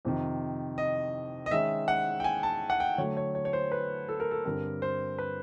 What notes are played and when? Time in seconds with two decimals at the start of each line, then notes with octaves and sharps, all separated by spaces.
0.05 F2 C3 D#3
0.78 D#5
1.46 D#5
1.51 D#3 G#3 C#4 E5
1.88 F#5
2.20 G5
2.24 G#5
2.43 A5
2.70 F#5
2.80 G5
2.98 D3 F#3 A3 C#5
3.17 C#5
3.35 C#5
3.45 C#5
3.53 C5
3.72 B4
4.09 A4
4.20 A#4
4.31 A4
4.45 G2 D3 G3 C4 A#4
4.82 C5
5.19 B4